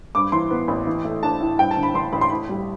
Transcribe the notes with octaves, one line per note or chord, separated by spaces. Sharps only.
G2 D6
E3 C6
B3
A1
E3
A3
D4 A5
A2
G2 G5
A5
D3
B5
A1 C6
A1 B5
C6
A2 B5
G3